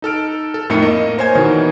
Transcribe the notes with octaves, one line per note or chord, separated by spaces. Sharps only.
D#4 A4 F6 D7
A4
F2 A2 A3 D#4 A#4 C#7
A#3 D#5
A#4 C5 C#5 G#5 G#6
B2 D#3 E3 D#4